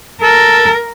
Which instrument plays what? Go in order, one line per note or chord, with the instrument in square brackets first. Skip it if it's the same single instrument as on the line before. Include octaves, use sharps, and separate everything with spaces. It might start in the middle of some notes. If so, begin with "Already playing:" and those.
[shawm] A4 [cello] A#4